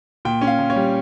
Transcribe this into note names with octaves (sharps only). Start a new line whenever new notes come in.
A#2 G5
C#4
F5
A#2
C#5
G3